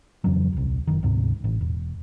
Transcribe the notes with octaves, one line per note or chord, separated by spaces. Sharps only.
F2 C#3 E3 F#3
D#1 C2
F#1 D#3
D2 G#2 C3
A1
E1